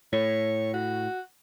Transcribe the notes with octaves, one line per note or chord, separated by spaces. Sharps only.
A2 C#5
F#4